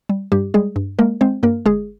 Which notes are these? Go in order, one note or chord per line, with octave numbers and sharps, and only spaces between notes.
G3
G2 G3 G4
G3 G#3 G#4
G2
G#3 A#3 A#4
G#3 C4 C5
G2 A#3 A#4
G1 G#3 G#4